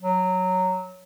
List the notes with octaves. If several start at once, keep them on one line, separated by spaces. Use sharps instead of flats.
F#3